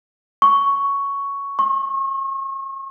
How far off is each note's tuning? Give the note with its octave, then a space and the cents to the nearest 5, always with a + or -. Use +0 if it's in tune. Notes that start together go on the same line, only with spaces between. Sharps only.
C#6 +5
C#6 -40